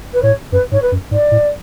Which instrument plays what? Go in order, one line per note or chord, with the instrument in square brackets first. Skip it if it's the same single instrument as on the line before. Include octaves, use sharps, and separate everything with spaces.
[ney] B4
[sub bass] A2 [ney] C#5
[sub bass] F#2 [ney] B4
[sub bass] G#2 [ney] C#5
[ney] B4
[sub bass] F#2
[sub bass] G#2 [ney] D5
[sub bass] A2